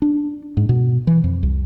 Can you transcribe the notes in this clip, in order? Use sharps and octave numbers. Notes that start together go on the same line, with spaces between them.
D4
G#2
B2
E3
F2
C2